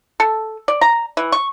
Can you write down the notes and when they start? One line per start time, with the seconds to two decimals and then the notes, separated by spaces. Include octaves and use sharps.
0.20 A4
0.68 D5
0.81 A#5
1.17 E3
1.32 C#6